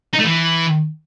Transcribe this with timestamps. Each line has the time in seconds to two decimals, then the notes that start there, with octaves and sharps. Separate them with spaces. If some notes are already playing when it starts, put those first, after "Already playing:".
0.13 D#4
0.19 A3
0.25 E3